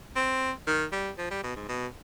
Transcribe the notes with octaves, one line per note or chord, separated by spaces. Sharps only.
C4
D#3
G3
F3
G3
B2
G#2
B2